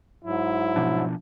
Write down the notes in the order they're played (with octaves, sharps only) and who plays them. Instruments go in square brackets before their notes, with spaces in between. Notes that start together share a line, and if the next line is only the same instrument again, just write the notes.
[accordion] G#2 F#3 [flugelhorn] E4
[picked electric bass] B2 F3 D4